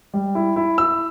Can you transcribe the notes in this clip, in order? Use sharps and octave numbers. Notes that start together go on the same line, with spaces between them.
G3
E4
E4
E4 E6